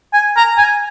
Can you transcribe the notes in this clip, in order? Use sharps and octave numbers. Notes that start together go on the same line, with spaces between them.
G#5
A#5
G#5